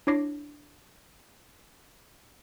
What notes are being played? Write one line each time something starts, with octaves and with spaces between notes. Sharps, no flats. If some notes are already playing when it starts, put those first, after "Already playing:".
D4 E4 C#5 D6 A#6 C7